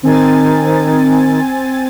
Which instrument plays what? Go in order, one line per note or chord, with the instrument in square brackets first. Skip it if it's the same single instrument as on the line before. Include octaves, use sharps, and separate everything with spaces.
[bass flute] D#3 [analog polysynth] C4 G#5 A6